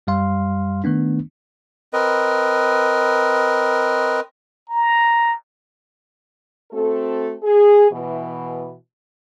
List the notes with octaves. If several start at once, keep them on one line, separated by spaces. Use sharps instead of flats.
F#2 G3 F5 C6
D#3 A3 B3 D4
C4 A#4 B4 D#5
A#5
A3 C4 F#4 A4
G#4
B2 E3